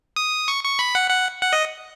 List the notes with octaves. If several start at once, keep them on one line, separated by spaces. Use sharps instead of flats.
D#6
C#6
C#6
B5
F#5
F#5
F#5
D#5